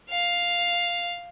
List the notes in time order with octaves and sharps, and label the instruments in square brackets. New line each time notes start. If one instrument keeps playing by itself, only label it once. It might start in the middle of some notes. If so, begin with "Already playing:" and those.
[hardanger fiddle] F5